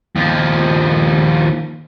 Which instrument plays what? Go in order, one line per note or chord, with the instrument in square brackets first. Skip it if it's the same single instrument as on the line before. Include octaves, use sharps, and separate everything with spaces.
[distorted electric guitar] D#2 F3